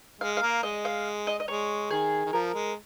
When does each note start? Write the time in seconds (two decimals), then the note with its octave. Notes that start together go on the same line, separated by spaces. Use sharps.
0.21 G#3 F5
0.37 F5
0.42 A#3
0.63 G#3 D#5
0.85 F5
1.27 D#5
1.40 D#5
1.48 G#3 C#5
1.90 D#3 G#4
2.25 D#3
2.33 F3 A#4
2.54 G#3